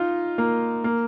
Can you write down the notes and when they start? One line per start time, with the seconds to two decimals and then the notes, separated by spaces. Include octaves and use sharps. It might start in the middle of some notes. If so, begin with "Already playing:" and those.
Already playing: D#4 F4
0.38 A#3
0.84 A#3